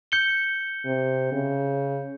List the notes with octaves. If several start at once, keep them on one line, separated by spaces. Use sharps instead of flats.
G6 C#7 G7
C3
C#3